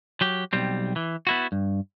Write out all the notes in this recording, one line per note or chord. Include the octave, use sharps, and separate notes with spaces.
F#3 G4
B1 G3 C4
E3
B3 E4 F#4
G2